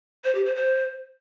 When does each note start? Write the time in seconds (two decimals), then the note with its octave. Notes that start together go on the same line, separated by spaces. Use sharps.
0.24 C5
0.34 G4
0.45 C5
0.55 C5